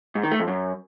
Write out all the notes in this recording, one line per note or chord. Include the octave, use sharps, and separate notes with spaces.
G#2
D#3
A3
F2
F#2